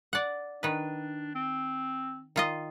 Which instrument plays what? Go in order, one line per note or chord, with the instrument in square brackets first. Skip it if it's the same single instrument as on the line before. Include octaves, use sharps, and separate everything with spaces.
[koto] D5 F#5
[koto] D#3 B4 [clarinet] D4
[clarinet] C4
[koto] D#3 F4 D#5